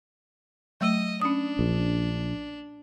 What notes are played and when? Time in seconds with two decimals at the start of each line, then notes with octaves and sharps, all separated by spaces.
0.81 F#3 A3 D#5 E6
1.22 C#4 D4 D#6
1.59 A#1